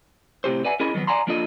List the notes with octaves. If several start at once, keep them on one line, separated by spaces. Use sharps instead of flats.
A2 C3 G4 C5
B4 D5 E5 F#5 G#5
C#4 E4 G#4 A#4 D#5 B5
D#3 F3 F#3 B3
D5 F#5 G#5 A#5 C6
F3 A#3 D4 F4 A4 D#5